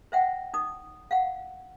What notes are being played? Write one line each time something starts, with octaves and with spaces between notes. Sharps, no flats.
C5 E5 F#5 G5
D#4 D#6
F5 F#5